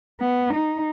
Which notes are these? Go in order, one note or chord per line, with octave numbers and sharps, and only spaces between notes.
B3
D#4